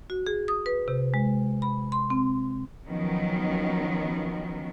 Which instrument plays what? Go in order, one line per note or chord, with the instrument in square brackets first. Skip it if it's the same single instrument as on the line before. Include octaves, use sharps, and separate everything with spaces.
[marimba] F#4
G#4
D#6
B4
C3
G#3
B5
C6
C4
[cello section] D#3 F3 F#3 B3 C#4